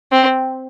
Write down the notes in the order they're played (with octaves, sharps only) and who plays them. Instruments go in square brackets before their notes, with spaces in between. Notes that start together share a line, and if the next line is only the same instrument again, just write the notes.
[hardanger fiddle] C4